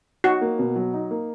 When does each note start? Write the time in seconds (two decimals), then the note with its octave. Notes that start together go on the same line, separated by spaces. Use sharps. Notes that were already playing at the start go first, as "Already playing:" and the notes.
0.24 D#4 F#4
0.41 A#3
0.59 B2
0.75 F#3
0.93 D#4
1.11 A#3